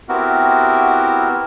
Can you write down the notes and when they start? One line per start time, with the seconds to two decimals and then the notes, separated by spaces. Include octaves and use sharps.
0.09 B3 C4 E4 F#4 G4 A#4